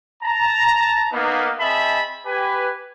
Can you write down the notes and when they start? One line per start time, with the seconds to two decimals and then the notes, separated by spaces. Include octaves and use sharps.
0.23 A5 A#5
1.13 A#3 B3 D#4
1.60 C4 G#4 D#5 E5 A5 B5
2.26 G4 B4 G#5